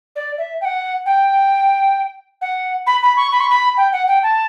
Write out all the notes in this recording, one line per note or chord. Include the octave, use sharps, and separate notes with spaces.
D5
E5
G5
F#5
G5
F#5
B5
B5
C#6
B5
C#6
B5
G5
F#5
G5
A5